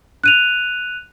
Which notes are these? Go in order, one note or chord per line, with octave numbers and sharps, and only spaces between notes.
F#6 D#7 F7